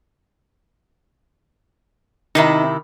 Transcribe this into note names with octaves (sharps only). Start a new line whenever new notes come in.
C3 D#3 D#4 E4